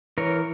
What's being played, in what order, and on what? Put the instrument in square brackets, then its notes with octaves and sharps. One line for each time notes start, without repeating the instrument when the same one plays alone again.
[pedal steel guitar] E3 A#4 C#5